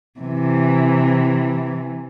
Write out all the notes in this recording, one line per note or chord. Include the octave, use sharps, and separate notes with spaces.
C3 E3